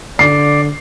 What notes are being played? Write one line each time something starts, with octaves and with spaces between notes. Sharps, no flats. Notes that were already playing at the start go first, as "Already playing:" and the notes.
D3 D5 C7